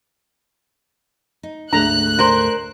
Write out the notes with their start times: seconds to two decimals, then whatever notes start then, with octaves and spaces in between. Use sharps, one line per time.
1.43 D#4
1.73 D2 G#2 A3 D4 A#5 F#6
2.19 A#4 C5